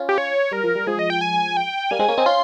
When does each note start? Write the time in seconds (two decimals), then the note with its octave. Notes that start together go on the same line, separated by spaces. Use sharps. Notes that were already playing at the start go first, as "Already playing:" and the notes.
Already playing: C#4 F4
0.09 G4
0.18 C#5
0.52 G3 A#4
0.64 F3
0.75 G3
0.87 F3 G#3 G#4
0.99 D#5
1.10 G5
1.21 G#5
1.57 G5
1.91 G3 A#3 G#5
1.99 G#3 C4
2.08 A#3 C#4
2.17 C4 D#4
2.26 C#4 F4 C6